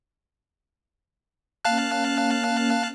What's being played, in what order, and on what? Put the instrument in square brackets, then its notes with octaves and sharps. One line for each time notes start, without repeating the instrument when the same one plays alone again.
[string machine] A#3 C#4 [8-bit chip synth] F5 A5 F#6